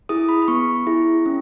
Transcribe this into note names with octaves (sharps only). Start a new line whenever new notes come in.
E4 G#4 D#6
B5
B5
B3 C#6
E4 G#4
C#4